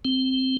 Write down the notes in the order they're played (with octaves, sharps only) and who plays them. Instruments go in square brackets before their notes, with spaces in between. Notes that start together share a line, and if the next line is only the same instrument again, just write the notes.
[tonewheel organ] C4